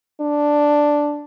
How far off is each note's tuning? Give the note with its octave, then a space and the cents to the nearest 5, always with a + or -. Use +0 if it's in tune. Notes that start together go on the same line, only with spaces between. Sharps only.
D4 +0